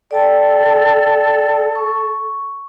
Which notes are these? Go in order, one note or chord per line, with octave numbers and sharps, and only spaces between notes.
A4 D5 G5 A5
C#6